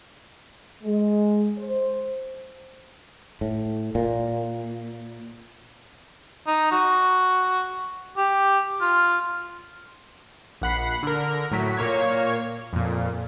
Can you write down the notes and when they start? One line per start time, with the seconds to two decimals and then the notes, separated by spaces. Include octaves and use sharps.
0.83 G#3
1.58 C5
3.41 A2
3.95 A#2
6.47 D#4
6.71 F#4
8.17 G4
8.81 F4
10.62 A#1 F#5 B5 C7
11.03 D3 A#4
11.51 A2 F#3 B6
11.77 A#2 A#3 C#5 G#6
12.73 F2 A#2